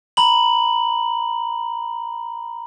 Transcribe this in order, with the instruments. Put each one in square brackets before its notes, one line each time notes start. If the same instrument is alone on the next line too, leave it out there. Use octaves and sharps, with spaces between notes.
[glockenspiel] A#5 B5 F#7